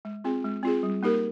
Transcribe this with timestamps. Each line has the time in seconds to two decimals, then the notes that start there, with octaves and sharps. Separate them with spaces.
0.05 G#3
0.24 C4 F4 G#4
0.44 G#3
0.63 C4 F4 G#4
0.83 G3
1.03 A#3 D#4 G4 A#4